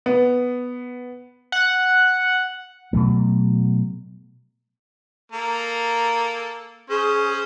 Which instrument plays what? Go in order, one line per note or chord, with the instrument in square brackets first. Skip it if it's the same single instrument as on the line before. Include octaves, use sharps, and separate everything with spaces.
[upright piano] B3
[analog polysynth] F#5
[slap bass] B2 F#3 A3
[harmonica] A#3 A4 A#5
[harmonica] C#4 C5 [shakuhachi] G#4